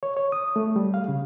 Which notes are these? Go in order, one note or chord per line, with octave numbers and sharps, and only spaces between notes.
C#5
C#5
D#6
A3
G3
F5
C#3